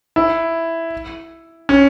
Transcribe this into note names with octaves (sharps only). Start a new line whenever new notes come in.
E4
C#4